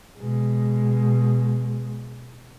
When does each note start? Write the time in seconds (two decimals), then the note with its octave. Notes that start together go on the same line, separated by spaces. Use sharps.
0.19 B2 G#3